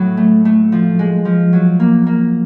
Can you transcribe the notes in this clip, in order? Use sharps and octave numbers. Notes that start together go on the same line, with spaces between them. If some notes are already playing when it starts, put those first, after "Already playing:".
Already playing: A2 F#3
A3
A3
F3
G#3
F3
F#3
A#3
A#3